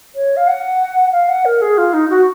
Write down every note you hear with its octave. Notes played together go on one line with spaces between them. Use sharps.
C#5
F5
F#5
F5
F#5
A#4
G#4
F4
D#4
F#4